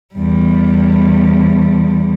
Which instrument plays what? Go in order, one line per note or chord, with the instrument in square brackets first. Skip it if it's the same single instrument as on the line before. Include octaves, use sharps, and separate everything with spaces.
[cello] E2 G3